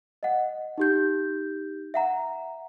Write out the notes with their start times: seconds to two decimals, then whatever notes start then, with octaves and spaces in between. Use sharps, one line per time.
0.23 D#5 F#5
0.78 D#4 G4 G6
1.94 E5 F#5 A#5